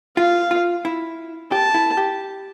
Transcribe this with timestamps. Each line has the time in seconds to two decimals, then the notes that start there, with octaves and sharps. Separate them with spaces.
0.17 F4 F5
0.51 F4
0.85 E4
1.52 G4 A5
1.74 E4
1.97 G4